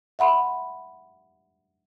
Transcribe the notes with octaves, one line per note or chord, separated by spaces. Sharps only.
E5 F#5 B5 C6